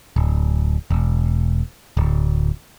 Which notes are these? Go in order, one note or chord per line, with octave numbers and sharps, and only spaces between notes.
D1
E1
D1